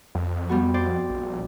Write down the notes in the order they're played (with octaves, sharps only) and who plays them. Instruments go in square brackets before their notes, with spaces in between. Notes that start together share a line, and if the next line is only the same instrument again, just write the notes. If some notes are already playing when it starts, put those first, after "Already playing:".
[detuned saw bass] F2
[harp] G3 B3 F#4
C5 D5
[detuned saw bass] A#1